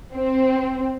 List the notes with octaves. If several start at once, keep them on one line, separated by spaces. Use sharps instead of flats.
C4